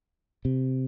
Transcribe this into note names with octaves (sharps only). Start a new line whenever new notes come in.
C3